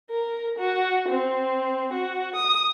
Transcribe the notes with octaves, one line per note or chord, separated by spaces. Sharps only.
A#4
F#4
C4
F#4
D#6